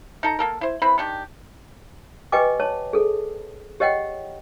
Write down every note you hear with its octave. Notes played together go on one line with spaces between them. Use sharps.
D#4 A4 A#5
A#3 A4 A#4
E4 C5
C4 E4 B4 B5
D#3 D4 G4
G4 B4 D#5 G5 G#5 D6
C#5 A5
G#4 A4
G4 C#5 D#5 F#5 G5